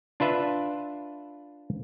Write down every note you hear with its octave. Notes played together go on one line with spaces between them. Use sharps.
D4 F4 B4 E5